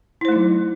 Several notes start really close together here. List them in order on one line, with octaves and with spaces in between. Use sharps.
E4 C5 A3 D#4 F#3